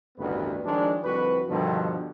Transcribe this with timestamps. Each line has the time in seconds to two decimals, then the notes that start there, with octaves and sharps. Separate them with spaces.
0.18 A1 D2 G2 D#3 B3 B4
0.64 D#3 F3 F#3 G#3 D4
1.03 C2 F2 D3 F#4 B4
1.49 G2 B2 D3 D#3 F3